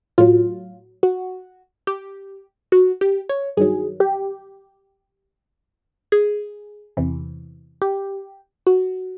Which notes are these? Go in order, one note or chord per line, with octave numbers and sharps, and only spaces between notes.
A2 F#3 F4
F#4
G4
F#4
G4
C#5
G2 D#3 F#3 G#4
G4
G#4
E2 C3 E3
G4
F#4